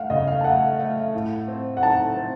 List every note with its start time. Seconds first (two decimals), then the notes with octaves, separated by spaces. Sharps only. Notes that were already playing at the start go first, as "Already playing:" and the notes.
Already playing: A3 F5 F#5
0.10 C#3 D#5
0.28 F5
0.41 A5
0.44 A3 F#5
0.79 A3
1.14 A2
1.48 C4
1.77 F#5
1.83 D#4 A5
2.17 C4